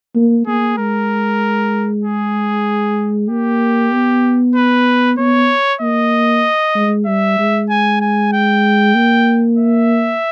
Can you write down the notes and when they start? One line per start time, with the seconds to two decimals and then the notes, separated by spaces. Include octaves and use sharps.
0.15 A#3
0.47 A#3 G#4
0.78 G#3 A#4
2.04 G#4
3.29 A#3 G4
3.93 B3
4.56 B4
5.19 B3 C#5
5.81 A#3 D#5
6.76 G#3
7.06 G3 E5
7.39 G#3
7.70 G#5
8.01 G#5
8.33 G5
8.95 A#3
9.58 E5